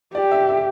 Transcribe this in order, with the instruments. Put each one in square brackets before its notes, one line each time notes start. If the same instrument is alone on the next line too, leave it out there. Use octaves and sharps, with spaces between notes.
[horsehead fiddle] G4 [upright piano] D5
[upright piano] E5
E5